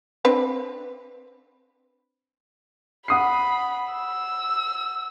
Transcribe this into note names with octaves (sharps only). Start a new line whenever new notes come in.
C4 D4 B4
F#5 B5 D#6 C7
E6